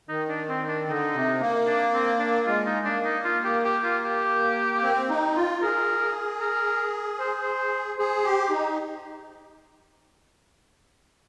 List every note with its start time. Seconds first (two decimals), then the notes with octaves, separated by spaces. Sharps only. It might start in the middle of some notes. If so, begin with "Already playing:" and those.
0.09 D#3 D#4
0.29 D4
0.49 C4
0.68 D4
0.89 D3 D#4
1.14 C3
1.40 A#3
1.67 D4
1.94 C4
2.19 D4
2.46 G#3 F4
2.66 D#4
2.85 A#3 D4
3.05 D#4
3.25 F4
3.44 G4
3.64 G4
3.84 F4
4.04 G4
4.82 C4
5.09 D#4
5.35 F4
5.62 G#4 A#4
6.40 A#4
7.20 C5
7.42 C5
7.98 G#4 C5
8.24 G4
8.50 D#4